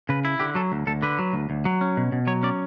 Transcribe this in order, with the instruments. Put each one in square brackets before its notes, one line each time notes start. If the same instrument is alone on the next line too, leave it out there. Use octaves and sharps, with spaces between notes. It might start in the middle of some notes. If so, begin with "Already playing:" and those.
[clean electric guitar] C#3 B4
E4
D3 G4
F#3 A4
D2
D2 A4
D3 B4
F#3
D2
D2
F#3
C#4
B2
B2
F#3 C#5
C#4 D5